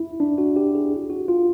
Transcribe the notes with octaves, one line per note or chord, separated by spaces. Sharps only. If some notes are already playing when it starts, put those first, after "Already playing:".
Already playing: E4
D4
F#4
G4
G#4
F#4
F4